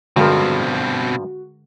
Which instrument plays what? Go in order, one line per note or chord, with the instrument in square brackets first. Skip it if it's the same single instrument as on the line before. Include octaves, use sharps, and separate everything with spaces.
[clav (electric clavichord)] G2 F3 [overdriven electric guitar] B2 C4 [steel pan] D3 G#3 A#4 [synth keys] F#4